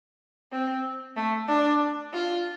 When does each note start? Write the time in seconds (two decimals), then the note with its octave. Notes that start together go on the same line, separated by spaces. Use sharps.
0.52 C4
1.16 A3
1.48 D4
2.13 F4